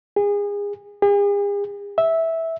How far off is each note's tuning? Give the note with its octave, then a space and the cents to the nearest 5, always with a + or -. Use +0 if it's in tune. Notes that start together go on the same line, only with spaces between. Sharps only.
G#4 -30
G#4 -45
E5 -10